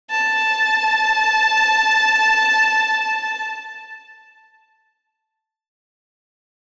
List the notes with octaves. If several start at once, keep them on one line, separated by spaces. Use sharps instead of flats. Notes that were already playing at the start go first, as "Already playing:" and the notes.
A5